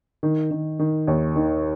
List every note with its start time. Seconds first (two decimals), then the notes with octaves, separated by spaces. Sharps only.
0.23 D#3
0.51 D#3
0.79 D#3
1.07 D#2
1.36 D#3